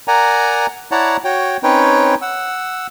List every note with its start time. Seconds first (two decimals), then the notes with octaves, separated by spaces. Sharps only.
0.08 A#4 D5 F#5 G#5 A#5
0.92 E4 C#5 D5 F#5 A5 A#5
1.24 F#4 C#5 G5
1.63 C4 C#4 D#4 B4 C#5 G5
2.22 F#5 E6